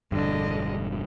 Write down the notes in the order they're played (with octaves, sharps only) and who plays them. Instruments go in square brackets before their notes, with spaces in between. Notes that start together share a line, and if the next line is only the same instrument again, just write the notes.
[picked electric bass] E1 G2 [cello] D3 D#5